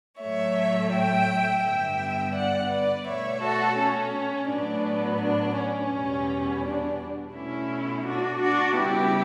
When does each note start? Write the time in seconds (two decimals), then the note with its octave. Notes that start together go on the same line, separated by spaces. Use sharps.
0.21 A2 F#3 A3 C#5 E5
0.93 E5 G5
1.64 G2 D3 G3 B3 E5 G5
2.35 D5 F#5
2.71 B4 D5
3.06 B2 A3 C#5 E5
3.42 F#4 A4
3.78 C#4
4.49 A2 F#3 B3 D4
5.21 D4
5.56 C#4
5.92 E2 B2 G3 B3
6.64 D4
7.34 B2 A3 C#4 E4
8.05 D4 F#4
8.42 D4 F#4
8.77 C#3 G3 B3 E4 G4